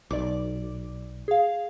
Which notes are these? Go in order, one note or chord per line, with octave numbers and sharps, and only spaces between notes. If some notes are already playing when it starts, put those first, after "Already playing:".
B1 D5 D6
G#4 F5